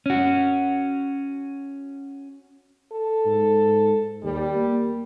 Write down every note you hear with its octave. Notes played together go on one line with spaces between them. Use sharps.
C#4 F#4
A4
G#2
D#2 G3
A#3